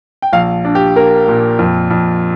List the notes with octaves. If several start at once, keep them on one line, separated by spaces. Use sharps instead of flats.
G5
A#1 F5
D4
G4
A#3 A#4
A#2
F2
F2